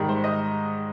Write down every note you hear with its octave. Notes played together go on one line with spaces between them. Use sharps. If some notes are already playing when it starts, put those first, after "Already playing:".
Already playing: G#2 D#3 G3
C5
D#5